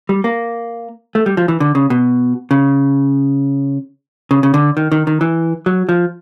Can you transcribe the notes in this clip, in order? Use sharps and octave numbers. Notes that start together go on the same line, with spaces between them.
G3
A#3
A3
G3
F3
E3
D3
C#3
B2
C#3
C#3
C#3
D3
D#3
D#3
D#3
E3
F#3
F3